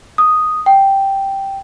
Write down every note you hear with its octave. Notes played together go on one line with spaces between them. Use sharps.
D#6
G5